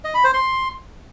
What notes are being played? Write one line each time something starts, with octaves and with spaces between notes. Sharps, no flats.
D#5
B5
C5
C6